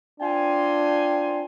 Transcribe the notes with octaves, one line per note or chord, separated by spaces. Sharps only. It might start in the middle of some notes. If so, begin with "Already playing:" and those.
C4 D4 F4 G5 G#5